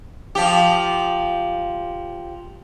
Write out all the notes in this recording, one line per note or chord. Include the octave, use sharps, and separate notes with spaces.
F3 G4